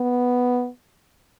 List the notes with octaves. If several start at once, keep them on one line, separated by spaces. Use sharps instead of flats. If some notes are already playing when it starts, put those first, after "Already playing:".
Already playing: B3